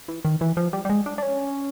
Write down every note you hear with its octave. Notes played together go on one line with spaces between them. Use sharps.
E3
D#3
E3
F3
G3
G3
G#3
D4
D4
C#4